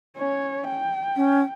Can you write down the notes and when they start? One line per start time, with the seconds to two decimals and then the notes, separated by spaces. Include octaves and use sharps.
0.17 C#4 C#5
0.68 G5
1.16 C#4